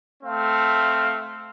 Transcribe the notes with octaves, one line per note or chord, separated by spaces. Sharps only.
A3 C4 F5